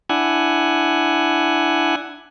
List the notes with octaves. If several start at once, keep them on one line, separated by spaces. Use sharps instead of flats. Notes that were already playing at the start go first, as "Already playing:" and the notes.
D4 E4 F#5 G#5